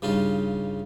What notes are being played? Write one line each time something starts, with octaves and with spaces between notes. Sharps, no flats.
G2 C#3 D#4 F4